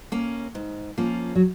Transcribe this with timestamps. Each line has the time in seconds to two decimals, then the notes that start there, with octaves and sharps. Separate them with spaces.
0.12 A#3 C#4
0.55 G#2
0.98 F3 A#3 C#4 F4
1.35 F#3